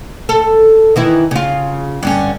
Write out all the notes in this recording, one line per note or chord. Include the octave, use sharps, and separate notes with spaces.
A4
D#3 E3 E4
C#3 F4
G2 D3 C#4